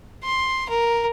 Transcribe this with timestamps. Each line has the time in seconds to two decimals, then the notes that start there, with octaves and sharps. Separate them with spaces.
0.24 C6
0.69 A#4